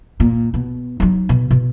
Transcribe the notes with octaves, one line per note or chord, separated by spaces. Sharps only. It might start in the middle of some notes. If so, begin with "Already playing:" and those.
A#2
B2
F#3 D#4
B2
B2